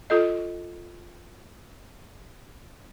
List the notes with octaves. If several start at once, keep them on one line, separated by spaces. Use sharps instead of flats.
F4 A4 D#5